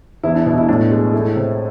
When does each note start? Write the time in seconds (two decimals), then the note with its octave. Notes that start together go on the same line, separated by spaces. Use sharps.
0.23 E2 E4
0.35 D4
0.46 B2 E4
0.58 E4
0.68 A2 D4
0.91 G#3
1.13 A3 E4
1.36 C3